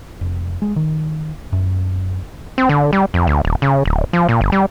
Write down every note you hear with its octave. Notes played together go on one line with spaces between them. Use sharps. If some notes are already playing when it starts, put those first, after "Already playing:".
F1
G#3
D#3
F#2
C4
D3
G3
F2
D2
D#1
C#3
D1
F3
A#2
G1
G3